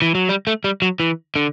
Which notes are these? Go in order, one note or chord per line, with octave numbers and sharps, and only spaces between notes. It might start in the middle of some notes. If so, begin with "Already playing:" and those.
E3
F#3
G3
A3
G3
F#3
E3
D3